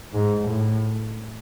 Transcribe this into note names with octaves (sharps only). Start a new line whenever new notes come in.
G#2
A2